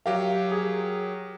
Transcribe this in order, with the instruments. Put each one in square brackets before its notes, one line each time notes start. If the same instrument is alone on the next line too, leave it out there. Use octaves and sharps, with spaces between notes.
[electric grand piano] F#3 G4 A#4 [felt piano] F5
[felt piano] G#4